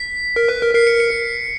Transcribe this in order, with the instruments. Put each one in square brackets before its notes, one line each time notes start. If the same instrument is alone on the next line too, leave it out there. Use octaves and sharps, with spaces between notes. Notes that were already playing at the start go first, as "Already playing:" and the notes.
Already playing: [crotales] B6
[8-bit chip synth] A#4
B4
A#4
[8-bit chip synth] A#4 [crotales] C7
[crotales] C#7
C#7